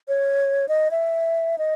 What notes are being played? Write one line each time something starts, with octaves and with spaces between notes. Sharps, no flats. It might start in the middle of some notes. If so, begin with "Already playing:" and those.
C#5
D#5
E5
D#5